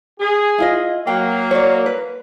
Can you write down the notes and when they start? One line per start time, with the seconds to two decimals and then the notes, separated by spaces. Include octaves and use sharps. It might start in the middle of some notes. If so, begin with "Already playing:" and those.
0.20 G#4
0.58 E4 F4 D#5
1.07 F#3 A#3 G5
1.51 C#5 D5
1.86 B4